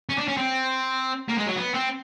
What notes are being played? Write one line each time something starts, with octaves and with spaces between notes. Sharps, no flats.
C#4
D4
C#4
C4
A#3
G#3
F#3
B3
C4